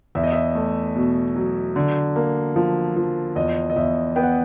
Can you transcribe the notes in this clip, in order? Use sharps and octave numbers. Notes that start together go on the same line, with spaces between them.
E2 E5
D#5
E5
A3
B2
F#3
D3
A#3
F3
F3
E2 D#5
D#5
E2 E5
B3 G5
F#5